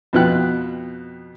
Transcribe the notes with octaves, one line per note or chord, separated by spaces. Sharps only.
F2 B2 B3 F4 G5 F#6